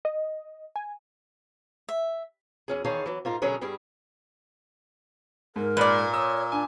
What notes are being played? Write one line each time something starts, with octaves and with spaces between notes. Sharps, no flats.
D#5
G#5
E5
E2 C#4 G#4
E2 D#3 G#4 C#5 F5 A5
E3 F#3
G#2 F4 A#4
B2 D3 F#3 C#4 G#4 A#4
G2 G3 G#4
G#2 A#4
A#2 B4 D5
C#5 D#6 E6
D4 G#5